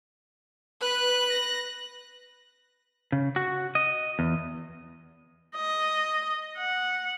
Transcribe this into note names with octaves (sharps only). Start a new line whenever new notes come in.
B4 F#6
A#6
C#3
F#4
D#5
E2
D#5
F#5